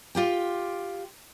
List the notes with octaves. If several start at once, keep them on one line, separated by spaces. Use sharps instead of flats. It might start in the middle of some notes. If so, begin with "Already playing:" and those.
F4 G4 G5